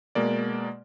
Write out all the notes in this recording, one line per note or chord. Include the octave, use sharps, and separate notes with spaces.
B2 G#3 A#3 D5